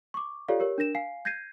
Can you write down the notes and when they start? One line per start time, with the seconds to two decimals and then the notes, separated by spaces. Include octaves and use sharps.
0.14 C#6 D6
0.48 F4 G4 A4 C#5 D5 F5
0.60 G4 A#4 C#5
0.78 D4 A#4 A#6 E7
0.95 F5 G#5 C7
1.25 G6 G#6 A#6 C7 D#7